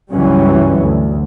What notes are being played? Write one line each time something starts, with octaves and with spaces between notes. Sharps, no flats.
C#2 G2 E3 F#3 G3 C#4
D2